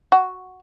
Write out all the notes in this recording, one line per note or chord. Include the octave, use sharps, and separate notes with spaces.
F#4